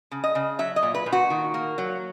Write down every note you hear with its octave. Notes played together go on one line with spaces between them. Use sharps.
C#3
D#5
C#3
F#3 E5
D#5
A#2
B4
A#2
F#4
D#3
A#3
F#3